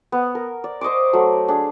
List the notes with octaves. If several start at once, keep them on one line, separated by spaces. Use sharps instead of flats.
B3
A#4
D5
C5 D#5 C#6 D6
F#3 A3
D4 G#4